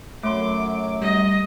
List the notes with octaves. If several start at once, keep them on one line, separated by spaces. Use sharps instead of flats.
F#2 F#3 A3 C6 D6
G3 D#5